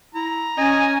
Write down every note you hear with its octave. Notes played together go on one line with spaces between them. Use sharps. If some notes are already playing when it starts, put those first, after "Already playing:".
E4 A#5
C#4 D#5 G#5